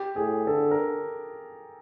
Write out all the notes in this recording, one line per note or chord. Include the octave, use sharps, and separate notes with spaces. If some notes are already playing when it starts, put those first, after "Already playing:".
Already playing: G4
A2 G#4
D3 A4
A#4